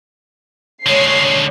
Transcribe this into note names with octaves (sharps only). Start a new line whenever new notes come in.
D3 G#3 C#5 C7